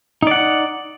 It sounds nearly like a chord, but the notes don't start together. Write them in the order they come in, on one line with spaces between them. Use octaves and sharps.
D#4 D5 F#5